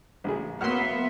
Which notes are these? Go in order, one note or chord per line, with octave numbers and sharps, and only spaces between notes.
A1 C#3 G#4
F#3 A#3 B3 E5 F#5 C6 F6